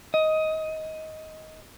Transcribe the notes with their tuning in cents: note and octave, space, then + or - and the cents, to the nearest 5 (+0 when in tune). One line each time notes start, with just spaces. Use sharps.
D#5 +15